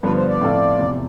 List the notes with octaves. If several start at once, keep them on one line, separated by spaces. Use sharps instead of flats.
G2 D3 F3 B3 B4
C5
D5
A2 F3 C4 F4 A4
F1 E2 C3